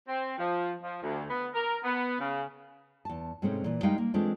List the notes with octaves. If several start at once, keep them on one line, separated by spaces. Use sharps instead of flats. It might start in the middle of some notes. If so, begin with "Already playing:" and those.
C4
F3
F3
D2
B3
A#4
B3
C#3
E2 A5
G#2 C3 G#3 A3 C4 C#4
A#2 E3
G3 G#3 D#4 A#4 F5 G5
A#3
E3 G#3 A3 C4 D4 F4